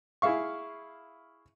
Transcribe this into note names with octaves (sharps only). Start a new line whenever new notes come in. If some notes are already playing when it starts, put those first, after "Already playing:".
E4 G#4 E5 F5 C#6